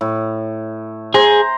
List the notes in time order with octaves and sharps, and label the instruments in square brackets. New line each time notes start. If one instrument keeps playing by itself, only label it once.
[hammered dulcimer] A2
[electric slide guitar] G#4 [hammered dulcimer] C5 A#5